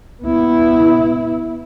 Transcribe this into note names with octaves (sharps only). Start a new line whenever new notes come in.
B3 E4